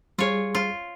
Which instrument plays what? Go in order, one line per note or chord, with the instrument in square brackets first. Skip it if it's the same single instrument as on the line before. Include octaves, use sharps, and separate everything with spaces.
[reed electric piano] G3 G#4 [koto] F4 C#5
[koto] F4